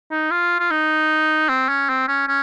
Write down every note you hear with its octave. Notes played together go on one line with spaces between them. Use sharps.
D#4
F4
F4
D#4
C4
C#4
C4
C#4
C#4